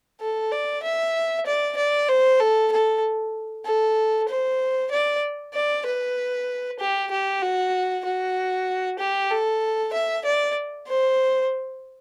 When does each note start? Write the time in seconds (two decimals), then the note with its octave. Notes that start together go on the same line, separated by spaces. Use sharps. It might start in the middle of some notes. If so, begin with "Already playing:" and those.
0.20 A4
0.52 D5
0.83 E5
1.46 D5
1.77 D5
2.09 C5
2.40 A4
2.72 A4
3.65 A4
4.29 C5
4.91 D5
5.54 D5
5.86 B4
6.80 G4
7.11 G4
7.42 F#4
8.05 F#4
8.99 G4
9.31 A4
9.93 E5
10.25 D5
10.88 C5